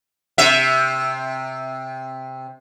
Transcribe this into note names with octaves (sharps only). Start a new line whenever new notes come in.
C3 E5